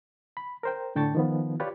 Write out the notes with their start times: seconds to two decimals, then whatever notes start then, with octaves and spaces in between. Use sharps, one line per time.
0.37 B5
0.63 A#4 C5 G5
0.95 A2 D3 G5 A5 C#6 A6
1.15 D#3 F3 B3
1.60 F4 G4 B4 C#5 D5